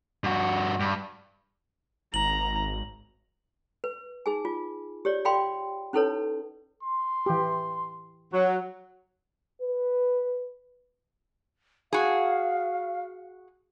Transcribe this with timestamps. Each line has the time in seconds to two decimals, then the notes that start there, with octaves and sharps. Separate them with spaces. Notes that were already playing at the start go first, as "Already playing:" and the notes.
0.24 G2 F#4
0.80 G2
2.14 G#1 A#5 F#7
3.84 B4
4.26 D#4 G#4 G#5
4.45 F4
5.05 G4 C#5 D5
5.25 D5 F5 G5 B5 C6
5.93 C#4 D#4 E4 A4 B4 C#5
6.83 C6
7.26 E3 G4
8.32 F#3
9.61 B4
11.93 F#4 G#4 F5